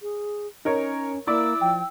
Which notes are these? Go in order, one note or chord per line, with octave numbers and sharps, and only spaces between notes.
G#4
C#4 D#4 A#4 C#5
A#3 E4 D5 E6
F3 G5